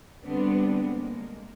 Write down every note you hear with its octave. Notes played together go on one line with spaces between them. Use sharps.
D3 G3 B3 C4 D4
G#3 A#3